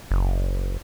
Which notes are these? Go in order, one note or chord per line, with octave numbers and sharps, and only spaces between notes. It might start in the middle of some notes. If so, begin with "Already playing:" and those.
F#1